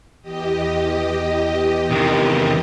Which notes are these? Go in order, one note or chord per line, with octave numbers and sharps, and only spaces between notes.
E2 G4 D#5
C3 D#3